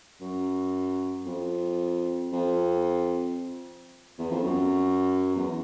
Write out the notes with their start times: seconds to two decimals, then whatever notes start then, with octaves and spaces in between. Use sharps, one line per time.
0.21 F#2
1.26 F2
2.32 F2
4.19 E2
4.31 F2
4.44 F#2
5.36 E2